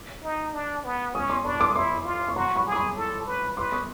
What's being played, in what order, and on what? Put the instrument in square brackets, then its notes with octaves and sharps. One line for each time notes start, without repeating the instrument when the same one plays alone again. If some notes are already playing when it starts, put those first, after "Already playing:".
Already playing: [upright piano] D6 E6
[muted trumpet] D#4
D4
B3
[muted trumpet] C#4 [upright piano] C#6 D#6
[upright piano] C6 D6
[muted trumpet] D4 [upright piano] B5 C#6
[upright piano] C6 D6
D#6
[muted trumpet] E4 [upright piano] C6 D6
[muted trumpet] F4
[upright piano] C#6
[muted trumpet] F#4 [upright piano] A#5 C6
[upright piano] B5 C#6
[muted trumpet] G#4
[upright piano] D6
B5 C#6
[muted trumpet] A4
B4
[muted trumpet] B4 [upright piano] C6 D6
[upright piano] C#6 D#6